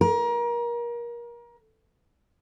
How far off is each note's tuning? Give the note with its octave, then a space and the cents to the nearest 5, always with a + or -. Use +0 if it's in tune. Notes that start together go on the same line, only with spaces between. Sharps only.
A#4 +30